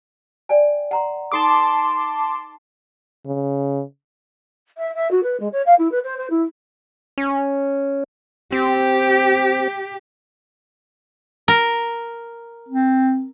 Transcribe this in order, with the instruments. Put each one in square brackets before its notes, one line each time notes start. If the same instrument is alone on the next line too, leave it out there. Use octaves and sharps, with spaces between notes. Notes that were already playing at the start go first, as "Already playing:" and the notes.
[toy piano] D5 G5 G#5
F#5 A#5 C6
[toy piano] D#4 A4 D#6 [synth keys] A5 C6 D6
[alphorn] C#3
[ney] E5
E5
F#4
B4
G#3
C#5
F5
E4
B4
C5
C5
E4
[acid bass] C#4
[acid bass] C4 [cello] G4
[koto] A#4
[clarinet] C4